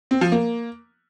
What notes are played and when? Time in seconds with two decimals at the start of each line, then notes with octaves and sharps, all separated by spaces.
0.11 C4
0.21 F3
0.32 A#3